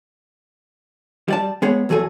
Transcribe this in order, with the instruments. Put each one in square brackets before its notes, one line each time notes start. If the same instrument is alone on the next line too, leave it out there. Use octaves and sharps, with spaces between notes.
[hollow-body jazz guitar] G3 D5 A5
G#3 B3 G#4 C#5
E2 F#3 G#4 A4 G#5